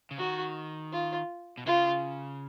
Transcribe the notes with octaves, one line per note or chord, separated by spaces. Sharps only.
C#3
D#3 F#4
F4
B2
C#3 F4